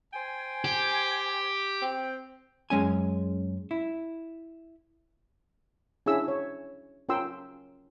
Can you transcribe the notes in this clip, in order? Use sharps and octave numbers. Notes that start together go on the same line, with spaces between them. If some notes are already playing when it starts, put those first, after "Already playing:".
C5 G5 G#5
G4
C4 G5
F#2 G#3 C#4 G#5
E4
C#4 D4 E4 G#4 E5 E6
C#5
C#4 F4 A#4 G5 C6 E6